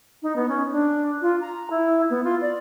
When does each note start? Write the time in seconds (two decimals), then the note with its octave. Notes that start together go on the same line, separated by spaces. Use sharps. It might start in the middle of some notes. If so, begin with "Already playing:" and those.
0.23 D#4
0.36 B3
0.49 C#4
0.72 D4
1.22 F4
1.41 A#5
1.70 E4
2.10 B3
2.24 F4
2.41 D5